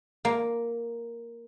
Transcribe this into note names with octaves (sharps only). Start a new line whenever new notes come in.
A#3